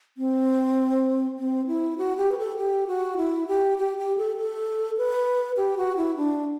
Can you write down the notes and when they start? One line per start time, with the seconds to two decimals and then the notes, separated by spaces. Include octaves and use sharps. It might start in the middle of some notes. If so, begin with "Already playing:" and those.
0.17 C4
1.38 C4
1.67 E4
1.98 F#4
2.17 G4
2.32 B4
2.38 A4
2.57 G4
2.87 F#4
3.17 E4
3.48 G4
3.78 G4
3.98 G4
4.17 A4
4.37 A4
4.97 B4
5.57 G4
5.77 F#4
5.97 E4
6.17 D4